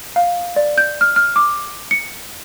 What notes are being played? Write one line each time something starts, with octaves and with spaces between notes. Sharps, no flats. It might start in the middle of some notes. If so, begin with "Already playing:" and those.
F5
D5
G6
F6
F6
D6
C#7